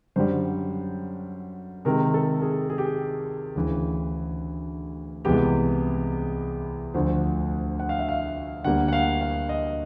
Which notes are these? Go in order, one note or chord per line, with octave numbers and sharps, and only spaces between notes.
F#2 D3 G3 C5
C3 D#3 G#3 A#4
A4
G#4
G#4
G4
G#4
D2 C#3 E3
C2 C3 E3 G#3 B3 G4
D2 D3 F3 A3 C5
F#5
F5
E5
F5
D2 D3 G3 A#3 F#5
F#5
F5
F5
D#5